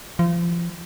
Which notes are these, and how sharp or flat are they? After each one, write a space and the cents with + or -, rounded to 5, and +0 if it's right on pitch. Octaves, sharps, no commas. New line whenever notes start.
F3 -30